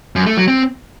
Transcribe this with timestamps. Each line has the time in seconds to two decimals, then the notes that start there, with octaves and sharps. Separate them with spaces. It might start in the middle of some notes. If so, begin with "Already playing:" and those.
0.16 F#2
0.26 A3
0.37 F#3
0.48 C4